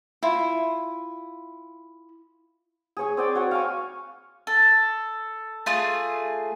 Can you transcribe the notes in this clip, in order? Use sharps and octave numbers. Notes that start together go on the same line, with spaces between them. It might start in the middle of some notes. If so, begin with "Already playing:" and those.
E4 F4
G#4 C#5 G#5
C4 D5 G5
F#4 C#5
F5 G#5 C#6
A4
A3 F4 G#4